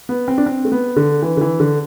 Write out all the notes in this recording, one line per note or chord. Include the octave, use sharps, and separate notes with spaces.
B3
C4
D4
C4
A3
B3
D3
E3
D3
E3
D3